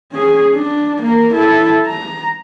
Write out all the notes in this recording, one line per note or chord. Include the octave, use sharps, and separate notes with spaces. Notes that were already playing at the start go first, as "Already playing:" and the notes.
C#4 G#4
D4
A#3 A#4
E4 A4
A#5